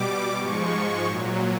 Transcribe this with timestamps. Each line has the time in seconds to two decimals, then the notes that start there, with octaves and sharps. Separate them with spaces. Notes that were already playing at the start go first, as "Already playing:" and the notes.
Already playing: B2 G3 D6
0.35 G#2 F3 G#3 C#6
1.05 A#2 F#3